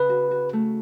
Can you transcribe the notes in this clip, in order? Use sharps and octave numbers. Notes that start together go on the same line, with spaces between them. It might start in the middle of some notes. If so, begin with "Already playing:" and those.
Already playing: C#3 B4
F#4
F#4
A3